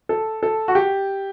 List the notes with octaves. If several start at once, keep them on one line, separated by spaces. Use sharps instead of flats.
A4
A4
F#4
G4